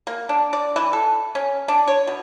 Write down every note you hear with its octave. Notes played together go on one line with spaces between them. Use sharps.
A#3
D4
D5
E3
A4
C#4
D4
C#5
B2